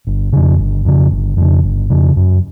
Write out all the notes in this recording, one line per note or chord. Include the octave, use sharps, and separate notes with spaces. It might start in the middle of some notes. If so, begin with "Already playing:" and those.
G1
F2 C#3
G1
F2 C#3
G1
F2 C#3
G1
F2 C#3
F#2